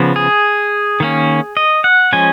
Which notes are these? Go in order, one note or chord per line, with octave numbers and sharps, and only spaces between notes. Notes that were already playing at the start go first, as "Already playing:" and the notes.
Already playing: C#3 F3 B3
G#4
D#3 A#3 C#4
D#5
F#5
F3 G#3 C#4 G#5